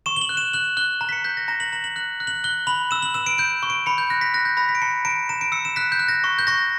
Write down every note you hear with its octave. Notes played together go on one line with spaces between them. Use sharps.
C#6 E7
G7
F#7
F#6
E7
F#6 F#7
F#6 G7
A#5
B6
C#7
G6 B6
A#6
A#5 A#6
F#7
A#5 F#7
F#7
F#6 F#7
F#6
F#7
F#6 G7
B5 F#7
E6 E7
F#7
E6 E7
D7
G6 D7
C#6
D7
B5 C#7
G6
F#6 A#6
B6
F#6 A#6
G6
B5 A#6
B6
D7
A#5 C#7
A#5 D7
A#5 E7
D7
E6 C#7
E7
F#6 B6
G6
F#6
A#6
C#6
G6
C#6 A#6